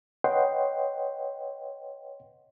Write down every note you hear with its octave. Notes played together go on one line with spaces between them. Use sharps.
B4 C#5 D#5 F#5 G5 C6